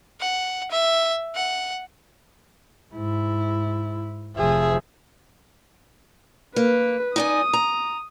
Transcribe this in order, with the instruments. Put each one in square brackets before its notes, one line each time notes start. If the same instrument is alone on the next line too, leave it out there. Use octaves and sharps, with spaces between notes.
[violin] F#5
E5
F#5
[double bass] G#2 E4
[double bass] F1 F3 [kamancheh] G#4 E5
[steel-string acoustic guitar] A#3 [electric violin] B4
[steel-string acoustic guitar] D#4 D5 G#5 [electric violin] D#6
[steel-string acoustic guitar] A#5